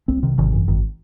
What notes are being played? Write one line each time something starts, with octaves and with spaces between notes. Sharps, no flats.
C2 C4
C3 D#3
G#1 D#3
F#2 E3
G#1 D#3